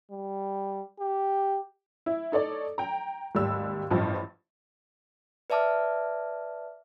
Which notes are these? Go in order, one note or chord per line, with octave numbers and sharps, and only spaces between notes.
G3
G4
E4
D#4 A4 C#5 D5
G5 A#5
G#1 D#2 G3 E6
A1 G2 F3
B4 D5 E5 A5 D6 F6